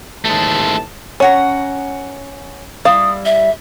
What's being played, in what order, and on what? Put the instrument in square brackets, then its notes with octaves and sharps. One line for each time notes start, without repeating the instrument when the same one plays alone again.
[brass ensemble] A1 D#2 A5 [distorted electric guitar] G#3 A3
[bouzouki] C#4 F#5 A#5 [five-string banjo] C#5
[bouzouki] G3 E4 [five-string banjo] F5 [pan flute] D#6
[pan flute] E5